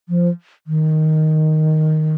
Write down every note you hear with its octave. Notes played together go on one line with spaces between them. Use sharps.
F3
D#3